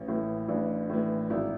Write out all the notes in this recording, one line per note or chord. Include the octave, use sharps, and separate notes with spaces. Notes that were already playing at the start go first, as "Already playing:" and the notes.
Already playing: A1 C#4
A2 E3
A1 D4
A2 E3
G#1 E4